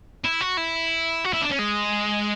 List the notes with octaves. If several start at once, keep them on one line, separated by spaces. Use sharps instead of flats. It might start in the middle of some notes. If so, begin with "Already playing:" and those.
E4
F#4
E4
F#4
E4
D4
C#4
G#3